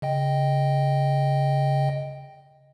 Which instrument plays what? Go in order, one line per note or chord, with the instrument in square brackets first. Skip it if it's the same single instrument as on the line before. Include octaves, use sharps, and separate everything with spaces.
[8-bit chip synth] C#3 D#5 G5